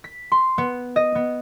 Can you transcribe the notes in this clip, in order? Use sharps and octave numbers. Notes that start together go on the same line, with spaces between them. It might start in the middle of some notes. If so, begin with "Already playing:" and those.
B6
C6
B3
D#5
B3